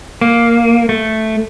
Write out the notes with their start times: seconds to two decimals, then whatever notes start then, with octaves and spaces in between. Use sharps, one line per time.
0.21 A#3
0.89 A3